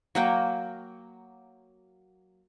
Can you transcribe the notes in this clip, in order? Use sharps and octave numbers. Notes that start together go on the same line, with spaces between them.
F#3 A#3 G5